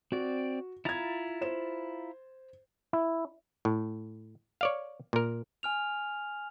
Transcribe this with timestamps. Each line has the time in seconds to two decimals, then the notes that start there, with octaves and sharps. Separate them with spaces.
0.12 C4 F#4 D5
0.85 E4 F4 A#5 G#6 A6
1.41 C5 E7
2.93 E4
3.65 A2
4.61 C#5 D5 F5
5.13 A#2 A#4
5.63 G#5 F6 F7